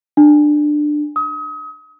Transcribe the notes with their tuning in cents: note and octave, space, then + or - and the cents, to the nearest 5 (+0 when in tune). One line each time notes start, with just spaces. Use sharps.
D4 +20
D#6 +35